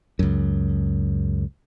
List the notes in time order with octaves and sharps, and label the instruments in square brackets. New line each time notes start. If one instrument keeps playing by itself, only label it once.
[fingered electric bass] C#2 F#2